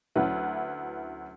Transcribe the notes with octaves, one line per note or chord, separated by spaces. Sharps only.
D2 F#3 C#4 E4 B4